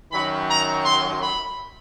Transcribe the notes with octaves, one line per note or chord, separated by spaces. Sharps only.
F#2 D#3 F#3 B5
A#5
C6
B5